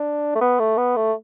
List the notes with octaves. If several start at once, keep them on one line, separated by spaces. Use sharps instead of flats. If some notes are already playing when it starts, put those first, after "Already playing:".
Already playing: D4
A3
B3
A3
B3
A3